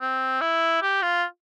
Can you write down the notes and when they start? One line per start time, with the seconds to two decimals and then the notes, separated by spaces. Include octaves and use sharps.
0.01 C4
0.42 E4
0.82 G4
1.03 F4